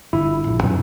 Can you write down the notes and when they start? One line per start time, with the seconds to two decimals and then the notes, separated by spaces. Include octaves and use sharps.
0.13 G1 E4
0.47 A#1
0.63 B1 F#2 B2 C#4